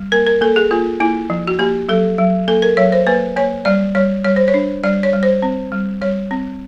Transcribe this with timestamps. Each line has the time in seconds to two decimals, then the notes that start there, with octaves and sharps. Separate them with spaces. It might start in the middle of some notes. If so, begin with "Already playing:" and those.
Already playing: G3
0.12 A#3 A#4
0.27 A#4
0.41 A#3 A4
0.56 G#4
0.71 A#3 F4
1.00 A#3 E4
1.30 F3
1.47 F#4
1.59 A#3 G4
1.89 F#3 A4
2.18 F#3
2.48 A#3 A4
2.62 A#4
2.77 F#3 C#5
2.92 C5
3.07 A#3 B4
3.36 A#3 C#5
3.65 G3 D5
3.95 G3 C#5
4.24 G3 C#5
4.36 C5
4.48 C#5
4.54 D4
4.83 G3 D5
5.03 C#5
5.13 G3
5.23 C5
5.42 C4
5.72 G3
6.02 G3 C#5
6.31 C4